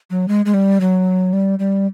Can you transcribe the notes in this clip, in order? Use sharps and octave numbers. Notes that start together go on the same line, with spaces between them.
F#3
G#3
G#3
G3
F#3
G3
G3